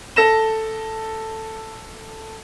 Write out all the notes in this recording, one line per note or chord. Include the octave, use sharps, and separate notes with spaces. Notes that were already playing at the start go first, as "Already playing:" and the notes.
A4 A#6 E7